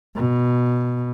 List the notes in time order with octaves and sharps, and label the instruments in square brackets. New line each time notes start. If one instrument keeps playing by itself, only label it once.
[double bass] B2